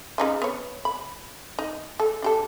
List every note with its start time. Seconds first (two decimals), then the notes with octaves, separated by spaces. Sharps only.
0.18 C#3 D#4 F4
0.42 B3 C#5
0.85 B5
1.59 D#4
2.00 A4
2.22 D4 G4 A4